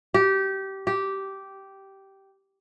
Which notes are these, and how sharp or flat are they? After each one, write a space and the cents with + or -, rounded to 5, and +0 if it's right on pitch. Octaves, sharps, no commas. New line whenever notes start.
G4 -20
G4 -10